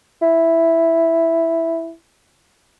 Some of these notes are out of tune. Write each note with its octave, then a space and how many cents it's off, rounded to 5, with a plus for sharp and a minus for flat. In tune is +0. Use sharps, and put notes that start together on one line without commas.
E4 +0